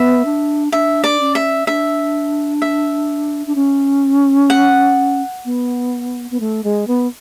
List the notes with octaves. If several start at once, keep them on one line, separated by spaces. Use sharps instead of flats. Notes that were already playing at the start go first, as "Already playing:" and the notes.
Already playing: B3 E5
D4
D4 E5
D5
C#4
E5
D4 E5
E5
D4
C#4
F#5
B3
B3
A3
G#3
B3